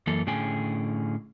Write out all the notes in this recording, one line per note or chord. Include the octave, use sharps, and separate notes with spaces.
F#2 E3 A#3 A4
A2 D3 C#4 G#4 G5 G#5